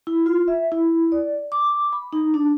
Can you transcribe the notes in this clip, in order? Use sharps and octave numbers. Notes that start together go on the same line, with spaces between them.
E4
F4
E5
E4
D5
D6
B5
D#4
D4